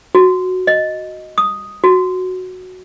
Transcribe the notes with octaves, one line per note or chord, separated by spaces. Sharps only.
F#4
D#5
D#6
F#4